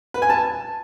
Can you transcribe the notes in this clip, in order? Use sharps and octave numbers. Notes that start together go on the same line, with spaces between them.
B4
G#5
A5